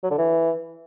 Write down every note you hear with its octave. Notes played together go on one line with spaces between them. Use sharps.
F#3
D3
E3